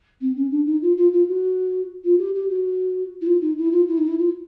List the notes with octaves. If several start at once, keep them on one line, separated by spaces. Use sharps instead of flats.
C4
C#4
D4
D#4
F4
F4
F4
F#4
F4
G4
G4
F#4
E4
F4
D#4
E4
F4
E4
D#4
E4
F4